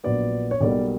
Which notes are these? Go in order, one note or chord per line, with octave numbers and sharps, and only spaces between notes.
A#1 A#2 F#3 B3 D5
C#5
B1 B2 G3 A#3 D5